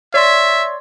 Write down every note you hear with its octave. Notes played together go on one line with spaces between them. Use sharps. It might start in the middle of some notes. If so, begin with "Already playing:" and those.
C#5 D5 E5 C6